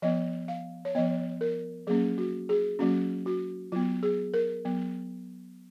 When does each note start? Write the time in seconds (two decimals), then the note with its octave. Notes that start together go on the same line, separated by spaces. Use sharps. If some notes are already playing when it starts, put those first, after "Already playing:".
0.02 F3 B3 D#5
0.48 F5
0.85 C#5
0.95 F3 B3 D#5
1.41 A#4
1.87 F#3 A#3 C#4 G#4
2.18 F#4
2.49 G#4
2.79 F#3 A#3 C#4 F#4
3.26 F#4
3.72 F#3 B3 F4
4.03 G#4
4.34 A#4
4.65 F#3 B3